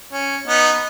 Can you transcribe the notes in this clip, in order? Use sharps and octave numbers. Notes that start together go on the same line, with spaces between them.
C#4
B3 D#4